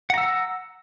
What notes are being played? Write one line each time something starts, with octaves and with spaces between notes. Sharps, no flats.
F#5 A#5 E6